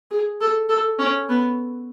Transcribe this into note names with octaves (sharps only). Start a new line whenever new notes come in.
G#4
A4
A4
C#4
B3